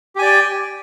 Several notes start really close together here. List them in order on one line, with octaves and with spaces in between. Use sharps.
G4 G#5 D5 G5